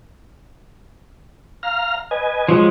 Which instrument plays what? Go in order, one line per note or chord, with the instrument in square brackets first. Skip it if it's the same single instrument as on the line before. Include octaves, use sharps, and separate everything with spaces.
[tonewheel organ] F5 A#5 F6
B4 D#5 G#5
[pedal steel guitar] F3 F#3 G#3